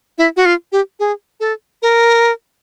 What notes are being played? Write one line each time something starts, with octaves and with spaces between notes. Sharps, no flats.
E4
F#4
F4
G4
G#4
A4
A#4